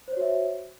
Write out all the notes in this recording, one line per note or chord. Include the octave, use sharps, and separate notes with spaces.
F#4 C5 C#5 E5